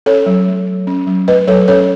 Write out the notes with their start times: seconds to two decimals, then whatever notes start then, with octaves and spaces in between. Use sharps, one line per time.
0.06 C#4 A4 C#5
0.26 F#3
0.47 A3
0.66 F#3
0.87 C#4
1.07 F#3
1.27 A3 B4 D#5
1.47 F#3 A4 C#5
1.68 C#4 A4 C#5